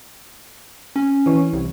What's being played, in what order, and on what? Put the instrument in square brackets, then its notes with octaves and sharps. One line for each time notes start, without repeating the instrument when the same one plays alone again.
[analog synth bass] C#4
[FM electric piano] E3 C#5
[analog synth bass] C2